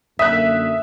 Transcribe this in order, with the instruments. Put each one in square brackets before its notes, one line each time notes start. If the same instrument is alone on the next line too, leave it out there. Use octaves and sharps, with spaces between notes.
[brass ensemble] F#2 D3 A#3 [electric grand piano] E5 [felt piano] D#6 F#6 [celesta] B6